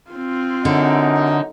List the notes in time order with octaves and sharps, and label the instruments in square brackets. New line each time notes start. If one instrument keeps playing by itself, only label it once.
[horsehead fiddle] C4 F4
[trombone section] F#2 D#4 [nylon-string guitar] D3